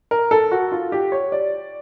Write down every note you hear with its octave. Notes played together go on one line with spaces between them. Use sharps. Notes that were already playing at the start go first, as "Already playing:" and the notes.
A#4
A4
F#4
F4
G4
C#5
D5